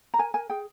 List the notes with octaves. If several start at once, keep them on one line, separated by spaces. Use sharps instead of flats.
A#5
A#4 G#5
A#4 G#5
G#4 G5